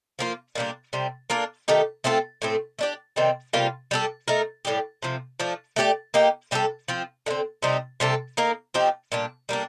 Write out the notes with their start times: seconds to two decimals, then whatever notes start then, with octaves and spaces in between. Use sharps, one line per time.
0.19 F3 A#3 F4
0.55 A#2 G3 A#3 D4
0.93 C3 G3 C4
1.30 A#3 D4 F4 A#4
1.68 D#3 A3 D#4 G4
2.04 A3 C4 F4 A4
2.42 A2 A3 C4
2.79 A3 D4 G4 D5
3.16 C3 D#3 G3 C4
3.53 C3 G3 A#3 F4
3.91 G3 D4 A4
4.28 A3 D#4 A#4
4.65 A2 G3 D4 G4
5.03 C3 F3 C4
5.40 F3 A3 D4
5.76 A3 D4 G4 D5
6.14 A#3 D#4 G4
6.51 C3 G3 D4 A4
6.88 F3 C4 F4
7.26 D3 A3
7.30 C4
7.62 C3 G3 C4 D#4
8.00 C3 G3 D4 A4
8.37 A#3 D#4 A#4
8.74 F3 C4 D#4 G4
9.12 A#2 G3 D4
9.49 G3 A#3 D4